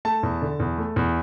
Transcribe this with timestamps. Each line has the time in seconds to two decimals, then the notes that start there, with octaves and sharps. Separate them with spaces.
0.05 A3 A5
0.23 E2
0.42 D3
0.60 E2
0.78 A3
0.96 E2